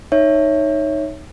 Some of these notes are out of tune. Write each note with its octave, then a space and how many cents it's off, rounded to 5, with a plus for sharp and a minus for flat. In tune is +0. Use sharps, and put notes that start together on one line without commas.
D#4 -5 C#5 +0 E5 +0